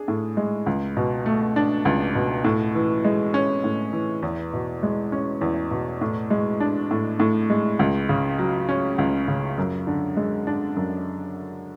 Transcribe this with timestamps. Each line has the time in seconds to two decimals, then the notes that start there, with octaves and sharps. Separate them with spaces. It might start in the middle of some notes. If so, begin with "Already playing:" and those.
Already playing: D4 G#4
0.08 A2
0.37 G#3
0.66 C#2
0.97 B2
1.26 A3
1.56 D4
1.85 C#2
2.15 B2
2.44 A2
2.75 E3
3.04 G#3
3.34 C#4
3.64 A2
3.93 E3
4.23 E2
4.53 B2
4.83 G#3
5.12 C#4
5.41 E2
5.71 B2
6.01 A2
6.30 G#3
6.60 D4
6.91 A2
7.20 A2
7.50 G#3
7.79 C#2
8.09 C#3
8.39 F#3
8.69 C#4
8.98 C#2
9.28 C#3
9.58 F#2
9.87 D3
10.17 G#3
10.47 D4
10.77 F#2